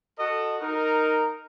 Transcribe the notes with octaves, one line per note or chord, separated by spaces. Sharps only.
F#4 A4 D#5
D#4 A#4